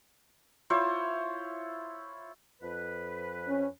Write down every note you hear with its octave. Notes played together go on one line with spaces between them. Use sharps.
E4 F4 C5 C#5
F2 B4
C#4